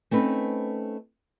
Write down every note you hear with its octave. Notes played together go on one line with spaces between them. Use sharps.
A3 C4 C#4 D#4 B4